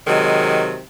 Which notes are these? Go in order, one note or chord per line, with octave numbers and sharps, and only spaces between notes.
C3 D#3 F#3 G#3